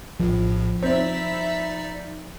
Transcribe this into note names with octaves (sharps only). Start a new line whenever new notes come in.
A#1 A2 F3
C4 D#4 E4 D5 E5 B6